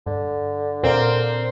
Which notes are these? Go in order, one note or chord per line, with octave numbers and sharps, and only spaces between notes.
G2 D3
A#2 C4 A#4 D5 F5